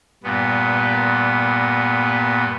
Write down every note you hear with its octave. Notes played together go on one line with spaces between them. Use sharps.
G2 A#2 B3